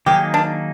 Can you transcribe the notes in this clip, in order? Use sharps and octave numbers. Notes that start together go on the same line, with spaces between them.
D#3 F#3 A#3 D#4 G4 G#4
D4